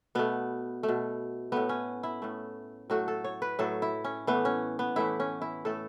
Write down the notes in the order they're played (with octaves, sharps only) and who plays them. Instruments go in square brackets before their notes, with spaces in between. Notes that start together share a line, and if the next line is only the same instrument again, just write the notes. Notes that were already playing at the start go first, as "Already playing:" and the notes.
[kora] B2 A3 B3
A3
B2
A2 A3 B3
C#4
E4
A2 A3
A2 F#3 A3 F#4
A4
C#5
B4
A2 F#3 A3 A4
E4
C#4
A2 E3 A3 B3
C#4
B3
A2 E3 A3 E4
C#4
E4
A2 A3 A4